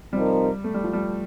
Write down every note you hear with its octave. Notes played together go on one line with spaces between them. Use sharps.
C3 F3 G3 C4 D#4 A#4
A3
G3
F3
G3